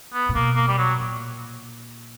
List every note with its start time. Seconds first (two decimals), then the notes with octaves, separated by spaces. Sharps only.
0.14 B3
0.29 A#2
0.35 B2 A#3
0.56 A#3
0.68 G3
0.78 F#3
1.00 A#2